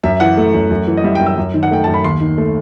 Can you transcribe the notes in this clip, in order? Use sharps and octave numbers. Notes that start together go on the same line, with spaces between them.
F#2 E5
E3 F#5
A3
F#2
F#2
E3
D#5
G3 E5
F#2 G5
E6
F#2
D#3
F#5
A3 G5
F#2 A5
B5
D#2 C6
D#3
A3